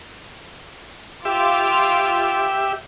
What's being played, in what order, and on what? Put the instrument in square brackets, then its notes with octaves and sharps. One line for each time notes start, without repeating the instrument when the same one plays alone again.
[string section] F4 D6 [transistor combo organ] G4 E5